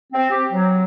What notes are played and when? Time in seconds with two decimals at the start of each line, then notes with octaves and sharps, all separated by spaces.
0.13 C4
0.31 G4
0.51 F#3